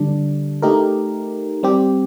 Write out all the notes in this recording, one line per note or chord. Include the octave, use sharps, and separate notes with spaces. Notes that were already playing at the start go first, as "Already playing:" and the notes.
Already playing: D3 G3 D4
A3 D#4 G4 A#4
G3 C4 G4